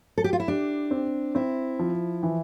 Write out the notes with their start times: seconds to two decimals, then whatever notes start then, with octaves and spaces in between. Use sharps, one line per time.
0.18 A4
0.24 G4
0.33 F4
0.40 E4
0.48 D4 G4
0.91 C4
1.35 C4 E4
1.79 F3
2.23 E3